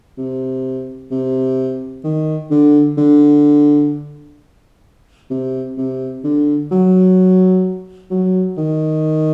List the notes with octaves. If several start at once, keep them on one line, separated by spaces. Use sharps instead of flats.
C3
C3
D#3
D3
D3
C3
C3
D3
F#3
F#3
D#3